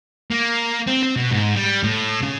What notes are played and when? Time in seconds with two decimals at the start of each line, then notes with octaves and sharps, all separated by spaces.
0.30 A#3
0.87 C4
1.03 C4
1.16 B2
1.31 G#2
1.56 G3
1.83 A2
2.23 C#3